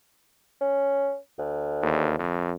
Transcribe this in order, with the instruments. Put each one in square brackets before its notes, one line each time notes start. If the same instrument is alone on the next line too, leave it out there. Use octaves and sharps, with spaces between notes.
[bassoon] C#4
D2
[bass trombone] D#2
F2